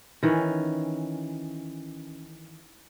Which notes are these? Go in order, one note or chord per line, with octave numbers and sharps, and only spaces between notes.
D#3 E3 C#4